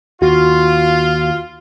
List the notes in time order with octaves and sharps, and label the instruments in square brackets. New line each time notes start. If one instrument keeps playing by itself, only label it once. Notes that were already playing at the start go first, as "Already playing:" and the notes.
[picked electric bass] D#2 [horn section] F4 [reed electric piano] F#4